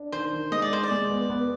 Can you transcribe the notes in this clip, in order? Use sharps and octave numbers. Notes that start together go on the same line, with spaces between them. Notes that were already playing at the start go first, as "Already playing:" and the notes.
Already playing: D4
D#3 C5
D#3
G#3 D#5
D5
G#4 C5
D5
G#3
B3
B3